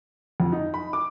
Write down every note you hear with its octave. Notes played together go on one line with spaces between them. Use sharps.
F2
D#4
B5
D6